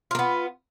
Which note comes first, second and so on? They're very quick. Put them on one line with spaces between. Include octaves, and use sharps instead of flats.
F4 A#3 B3